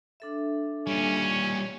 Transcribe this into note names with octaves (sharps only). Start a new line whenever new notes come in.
D4 A4 E5
A#2 G3 C#4